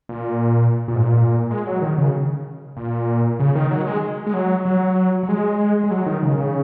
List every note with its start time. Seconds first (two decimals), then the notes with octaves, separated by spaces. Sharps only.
0.09 A#2
0.88 A#2
0.95 G#2
1.02 A#2
1.51 G#3
1.67 F#3
1.82 D#3
1.98 C#3
2.77 A#2
3.40 C#3
3.55 D#3
3.71 F#3
3.87 G#3
4.27 G#3
4.34 F#3
4.65 F#3
5.23 F#3
5.29 G#3
5.84 G#3
5.91 F#3
6.06 D#3
6.23 C#3
6.38 C#3